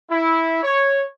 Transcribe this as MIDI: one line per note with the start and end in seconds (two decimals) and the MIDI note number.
0.10 0.58 64
0.63 1.02 73